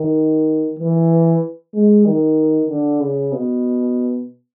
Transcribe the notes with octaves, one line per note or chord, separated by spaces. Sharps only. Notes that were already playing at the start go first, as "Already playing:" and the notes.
Already playing: D#3
E3
G#3
D#3
D3
C#3
B2